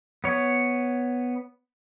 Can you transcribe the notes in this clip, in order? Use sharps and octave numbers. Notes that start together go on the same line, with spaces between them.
B3 C#5